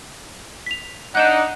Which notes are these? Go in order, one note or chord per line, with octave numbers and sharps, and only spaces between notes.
B6 F7
D4 D#4 F#5 F#6 G6 E7